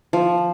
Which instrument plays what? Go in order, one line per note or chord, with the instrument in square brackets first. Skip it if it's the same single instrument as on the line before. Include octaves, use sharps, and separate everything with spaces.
[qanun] F3